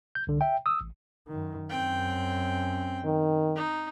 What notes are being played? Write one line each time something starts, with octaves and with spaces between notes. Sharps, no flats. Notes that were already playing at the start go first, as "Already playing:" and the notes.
G6
C2 D3
E5 G5
D#6 E6
A1
F#2 D#3
F#2 C4 C#4 G5
D#3
D#4